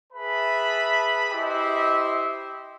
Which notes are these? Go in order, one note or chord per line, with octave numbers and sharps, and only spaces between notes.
G#4 B4 E5 A5 B5
E4 G4 C5 D#5 E5